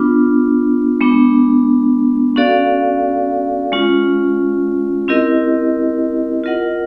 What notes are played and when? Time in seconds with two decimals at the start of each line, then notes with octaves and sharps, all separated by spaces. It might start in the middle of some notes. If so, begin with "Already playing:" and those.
Already playing: B3 D4 F4
1.01 G#3 B3 D4
2.36 C#4 F#4 A4 D5 F5
3.72 G#3 C#4 F4
5.08 C4 E4 G4 A#4 D#5
6.44 F4 A#4 D#5 F#5